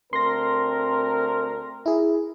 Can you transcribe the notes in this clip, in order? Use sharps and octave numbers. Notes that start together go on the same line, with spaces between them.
D2 C4 A#4 C6 A#6
E4 G#4